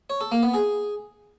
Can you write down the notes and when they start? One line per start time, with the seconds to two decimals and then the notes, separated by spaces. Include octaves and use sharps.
0.10 C#5
0.21 A4
0.32 A#3
0.43 B3
0.54 G#4